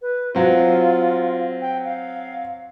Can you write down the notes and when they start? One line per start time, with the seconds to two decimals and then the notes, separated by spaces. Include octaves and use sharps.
0.02 B4
0.35 F#3 C4 F4
1.61 G5
1.85 F5